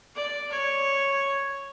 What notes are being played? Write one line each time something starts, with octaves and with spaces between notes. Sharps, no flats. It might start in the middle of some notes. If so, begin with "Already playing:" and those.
D5
C#5